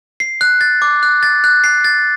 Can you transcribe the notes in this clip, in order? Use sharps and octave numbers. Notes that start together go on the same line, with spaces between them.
C7
F#6
A6
D6
F#6
A6
F#6
C7
A6